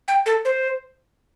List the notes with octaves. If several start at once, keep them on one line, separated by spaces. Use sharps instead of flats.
G5
A4
C5